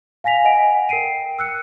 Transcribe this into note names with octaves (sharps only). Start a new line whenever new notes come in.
F5 G#5 A#6 B6 F7
D#5 F#5 G#5 A#6 D7
A#4 G5 C7 D7 D#7
E6 F#6 C#7